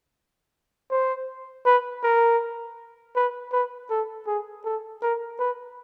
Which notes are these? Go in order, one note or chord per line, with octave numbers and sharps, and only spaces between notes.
C5
B4
A#4
B4
B4
A4
G#4
A4
A#4
B4